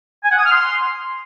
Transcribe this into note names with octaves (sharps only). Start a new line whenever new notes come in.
G#5
F#5
D#6
F6
C6